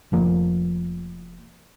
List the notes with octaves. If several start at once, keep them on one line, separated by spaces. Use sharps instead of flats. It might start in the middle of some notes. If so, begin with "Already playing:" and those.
F1 F2 F3 A#3